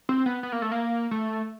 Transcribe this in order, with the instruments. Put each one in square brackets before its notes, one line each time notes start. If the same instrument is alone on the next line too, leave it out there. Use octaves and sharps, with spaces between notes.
[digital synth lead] C4
B3
B3
A#3
A3
A#3
A3